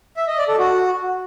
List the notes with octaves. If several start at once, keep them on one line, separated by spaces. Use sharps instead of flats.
E5
D#5
D5
A4
F#4